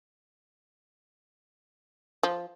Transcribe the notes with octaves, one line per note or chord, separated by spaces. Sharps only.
F3